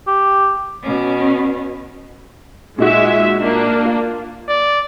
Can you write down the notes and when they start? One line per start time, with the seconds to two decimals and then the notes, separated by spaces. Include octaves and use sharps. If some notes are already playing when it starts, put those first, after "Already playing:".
0.07 G4
0.82 B2 C#4
2.78 A#2 G#3 D#4 F#4 E5
3.40 A#3 D4
3.85 F4
4.48 D5